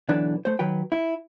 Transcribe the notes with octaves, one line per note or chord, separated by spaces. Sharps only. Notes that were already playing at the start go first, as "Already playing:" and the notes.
B1 D3 E3 D4 B4
A3 C5
D#3 F#3 B4 G5
E4